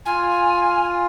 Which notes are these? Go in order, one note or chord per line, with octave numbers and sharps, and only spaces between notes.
F4 G#5